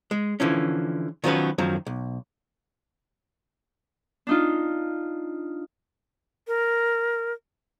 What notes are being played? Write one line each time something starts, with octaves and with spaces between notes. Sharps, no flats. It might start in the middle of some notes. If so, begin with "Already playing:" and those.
G#3
D3 E3 F3 C#4
D#3 F3 F#3 B3 C#4 B4
F#2 D#3 F3 F#3
B1
D4 D#4 F4
A#4